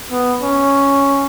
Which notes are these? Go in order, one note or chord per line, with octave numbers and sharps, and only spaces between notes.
B3
C#4